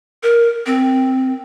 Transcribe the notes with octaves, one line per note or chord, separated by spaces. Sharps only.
A#4
C4